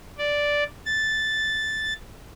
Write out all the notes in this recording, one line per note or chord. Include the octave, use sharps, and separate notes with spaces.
D5
A6